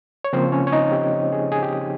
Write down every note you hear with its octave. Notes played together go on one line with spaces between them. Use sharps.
C#5
C#3 F3 A#3 C4 C5
C#4 C#5
C#5
D#4 D#5
G4
G#4
G#4
G4